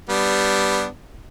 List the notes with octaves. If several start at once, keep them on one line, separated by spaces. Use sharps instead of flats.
G3 B3 D4